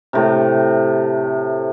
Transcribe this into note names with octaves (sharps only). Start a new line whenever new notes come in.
A2 C3